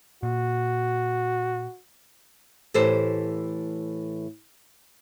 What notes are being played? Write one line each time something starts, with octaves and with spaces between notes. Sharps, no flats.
A#2 F#4
A2 E3 G4 A4 C5